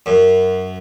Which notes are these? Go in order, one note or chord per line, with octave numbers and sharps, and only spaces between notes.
F#2